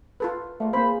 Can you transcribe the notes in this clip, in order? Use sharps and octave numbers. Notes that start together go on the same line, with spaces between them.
F4 A4 B4
A#2 A3 A#3 F4
A#3 C4 G#4 B4 C5 B5 C#6